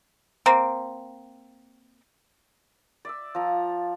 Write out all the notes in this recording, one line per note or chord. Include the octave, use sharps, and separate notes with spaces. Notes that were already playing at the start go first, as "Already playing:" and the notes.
A#3 C4
D5 E5 E6
F3 A#5